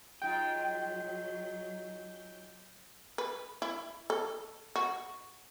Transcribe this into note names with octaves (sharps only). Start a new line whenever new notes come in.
F#3 G#3 D#4 F4 G5 G6
B4
E4
A4
F#4